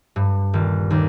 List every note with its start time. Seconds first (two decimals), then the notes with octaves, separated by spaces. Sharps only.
0.16 G2
0.54 D#1
0.90 D#2